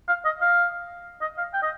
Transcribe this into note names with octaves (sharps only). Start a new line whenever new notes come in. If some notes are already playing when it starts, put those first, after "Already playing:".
F5
D#5
F5
D#5
F5
G5
D#5